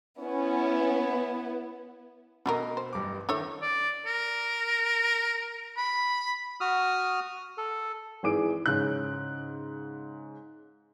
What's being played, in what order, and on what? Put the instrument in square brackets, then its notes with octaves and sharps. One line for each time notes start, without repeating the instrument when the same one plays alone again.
[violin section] B3 E4 [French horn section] C#4
[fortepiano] B2 D#5 [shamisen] D3 A3 A#4
[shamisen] C5
[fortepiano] A1 G2 D6
[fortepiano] D#3 E4 [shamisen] D4 A4 C#5
[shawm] D5
A#4
B5
[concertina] F#4 D#6 F6
A4
[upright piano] G#1 E3 G#4 D6 D7
G#2 C#3 F#6